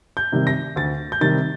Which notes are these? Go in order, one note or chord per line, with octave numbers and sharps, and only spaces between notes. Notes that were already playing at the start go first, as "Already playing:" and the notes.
G6
C3 D#3 G3
A#6
D2 A6
G6
C3 D#3 G3 A6